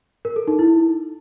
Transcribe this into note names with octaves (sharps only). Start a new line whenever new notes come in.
A#4
A4
D#4
E4